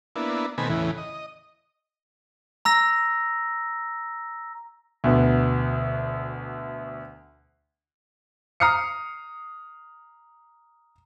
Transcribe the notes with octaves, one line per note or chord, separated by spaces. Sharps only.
A#3 B3 D4 E4
B2 D#3 A3 C4 G#5 B5
E2 A2 C#3 E3
D#5
A#5 E6 A#6
D2 B2 B3
A#5 D#6 F6 C7 C#7